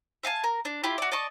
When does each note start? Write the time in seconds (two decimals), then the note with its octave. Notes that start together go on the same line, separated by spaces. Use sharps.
0.23 E5 F5 G#5 A5
0.44 A#4
0.65 D4
0.84 E4 F4 G4
0.98 F#4 D5
1.12 D5 D#5 A5 C#6